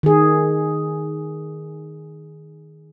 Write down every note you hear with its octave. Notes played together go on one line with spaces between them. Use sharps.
D#3 G#4